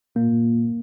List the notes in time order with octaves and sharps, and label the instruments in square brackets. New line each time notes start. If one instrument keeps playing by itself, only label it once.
[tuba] A#2 [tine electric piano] A#3